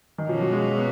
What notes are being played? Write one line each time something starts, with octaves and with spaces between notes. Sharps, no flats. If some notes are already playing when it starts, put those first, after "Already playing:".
D#3
B2 F3 A#3 C#4
F#3
G#3
B3